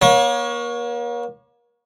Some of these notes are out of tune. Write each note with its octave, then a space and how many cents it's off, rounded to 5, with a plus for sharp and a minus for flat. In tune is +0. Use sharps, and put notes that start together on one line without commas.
A#3 +40 C#5 +0